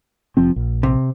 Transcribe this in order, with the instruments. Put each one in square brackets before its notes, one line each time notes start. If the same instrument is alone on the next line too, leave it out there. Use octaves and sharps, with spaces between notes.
[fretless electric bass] F1 F3 C4
A#1
[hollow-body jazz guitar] C3